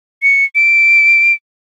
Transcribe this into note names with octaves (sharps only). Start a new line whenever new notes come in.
C#7
D7